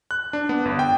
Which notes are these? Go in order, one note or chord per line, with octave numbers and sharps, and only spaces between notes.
F#6
D4
B3
G1
G5